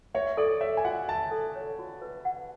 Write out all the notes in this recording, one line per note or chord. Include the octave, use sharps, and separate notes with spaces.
C#5 E5
A4 D5
C#5 E5
G#5
F#4 F#5
E5 A5
A4
C#5
F#4
B4
F#5